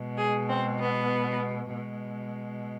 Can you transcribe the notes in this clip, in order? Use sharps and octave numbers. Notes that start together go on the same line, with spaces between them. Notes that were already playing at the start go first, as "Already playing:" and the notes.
Already playing: B2 G#3
G#4
C4
B3
B2 G#3